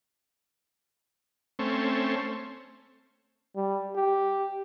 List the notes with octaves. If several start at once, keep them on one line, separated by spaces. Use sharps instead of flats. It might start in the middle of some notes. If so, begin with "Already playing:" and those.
A3 C4 C#4
G3
G4